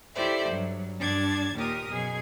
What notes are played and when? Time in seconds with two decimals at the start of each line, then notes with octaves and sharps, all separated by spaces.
0.15 E4 G4 A4 C5 D5 E5
0.49 G2 F#3
1.00 G2 D4 A5 G#6 A6
1.54 D#2 A#2 G4 A#4 D#6
1.89 F#2 B2 G#4 G#6